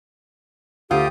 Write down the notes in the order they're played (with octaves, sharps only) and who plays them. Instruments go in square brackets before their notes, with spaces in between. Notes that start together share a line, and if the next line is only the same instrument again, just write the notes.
[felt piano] D2 [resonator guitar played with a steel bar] F4 [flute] G4 [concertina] G5 D#6